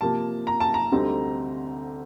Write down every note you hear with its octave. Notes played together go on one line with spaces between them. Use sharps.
C3 F3 A#3 A5
A#5
A5
A#5
D2 D3 G3 C4 D#4